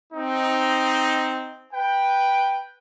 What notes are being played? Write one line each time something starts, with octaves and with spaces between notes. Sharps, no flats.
C4 D#4
B4 G5